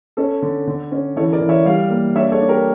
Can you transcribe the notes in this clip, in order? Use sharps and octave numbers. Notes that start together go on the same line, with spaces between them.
C#4 A4
D3
D3
C#4
E3 A4 C#5
A#4 D5
E3
C#5 E5
G3 D5 F5
A#3
D4 C#5 E5
A4 C#5
D4
G4 A#4